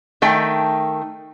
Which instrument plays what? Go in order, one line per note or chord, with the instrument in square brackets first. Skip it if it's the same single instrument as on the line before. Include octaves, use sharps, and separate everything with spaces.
[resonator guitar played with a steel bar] D#3 A3 G5